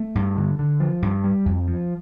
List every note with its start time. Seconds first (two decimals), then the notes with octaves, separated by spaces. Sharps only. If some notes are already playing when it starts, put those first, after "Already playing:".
Already playing: A3
0.15 G2
0.37 D3
0.59 D3
0.80 F3
1.02 G2
1.24 G3
1.46 F2
1.68 F3